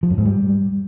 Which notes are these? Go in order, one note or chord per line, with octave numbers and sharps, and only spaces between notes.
F3
F#2
G#2
G3